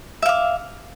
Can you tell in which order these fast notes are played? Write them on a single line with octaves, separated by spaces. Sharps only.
E5 F5 D6